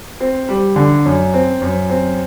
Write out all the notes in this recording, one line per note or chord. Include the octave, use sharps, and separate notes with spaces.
C4
G3
D3
F#2
C4
F#2
C4